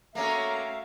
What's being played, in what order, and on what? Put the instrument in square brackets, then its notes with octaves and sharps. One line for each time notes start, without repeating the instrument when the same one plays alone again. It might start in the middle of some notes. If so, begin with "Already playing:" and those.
[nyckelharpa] A3 F#4 [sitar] A#3 C#4 [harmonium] E5 F5 [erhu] A#5